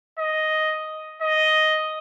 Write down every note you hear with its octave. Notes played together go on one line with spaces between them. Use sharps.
D#5
D#5